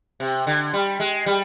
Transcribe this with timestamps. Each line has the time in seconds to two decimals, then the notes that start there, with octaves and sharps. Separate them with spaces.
0.20 C3
0.47 D3
0.73 G3
1.00 G#3
1.26 G3